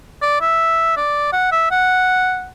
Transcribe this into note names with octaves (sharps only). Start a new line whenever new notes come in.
D5
E5
D5
F#5
E5
F#5